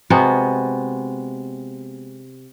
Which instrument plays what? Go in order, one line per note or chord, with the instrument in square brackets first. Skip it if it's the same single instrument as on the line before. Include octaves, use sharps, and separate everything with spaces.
[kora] C3 G#3 B3 F#4